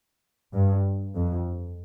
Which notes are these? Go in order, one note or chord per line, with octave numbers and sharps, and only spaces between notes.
G2
F2